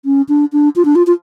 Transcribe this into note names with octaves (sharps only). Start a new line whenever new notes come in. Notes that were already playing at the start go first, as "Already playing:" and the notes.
C#4
D4
D4
F4
D4
F4
F4